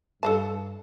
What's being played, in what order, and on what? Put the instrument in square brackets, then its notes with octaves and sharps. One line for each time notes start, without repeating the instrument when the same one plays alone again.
[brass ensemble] G2 [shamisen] A4 F5 A5